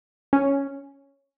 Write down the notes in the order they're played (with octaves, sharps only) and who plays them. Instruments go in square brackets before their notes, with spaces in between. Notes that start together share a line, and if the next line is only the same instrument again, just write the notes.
[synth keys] C#4